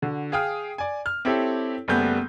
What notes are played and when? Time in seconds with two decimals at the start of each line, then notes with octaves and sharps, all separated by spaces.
0.02 D3 F#4
0.32 G#4 F5 G5 D#6 F6
0.78 D5 G#5
1.06 F6
1.25 C4 E4 G4 A4 C#5
1.88 F#1 G3 A3 B3 G6